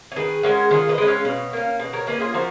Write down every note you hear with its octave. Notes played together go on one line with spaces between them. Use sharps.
C#5
D#3 G#4 B4
G#3 C#4 F#4 A#4
D#3 F4 G#4
B4 D#5
G#3 C#4
C#5 F5
B2
A#3 C#4
B2
A#4 C#5
A#3 C#4 G#4 B4
F4 G#4
F3 F#4 A#4